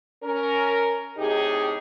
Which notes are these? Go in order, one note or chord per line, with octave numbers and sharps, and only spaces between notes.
C#4 A#4
A2 C3 D#4 G4 G#4